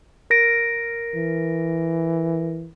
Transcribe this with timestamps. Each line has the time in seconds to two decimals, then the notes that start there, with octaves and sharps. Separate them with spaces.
0.30 A#4 A#6 D7
1.15 E3